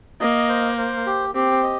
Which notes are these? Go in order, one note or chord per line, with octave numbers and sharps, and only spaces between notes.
A#3 D#5
C5
C5
G4
C4 G4
D#5